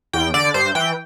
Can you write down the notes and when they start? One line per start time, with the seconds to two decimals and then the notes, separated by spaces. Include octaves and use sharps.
0.13 E2 G5
0.34 D3 D5
0.54 G2 C5
0.75 E3 G5